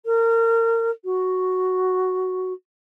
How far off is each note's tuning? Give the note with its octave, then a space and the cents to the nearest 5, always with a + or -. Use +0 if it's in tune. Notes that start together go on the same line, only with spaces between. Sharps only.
A#4 -30
F#4 +0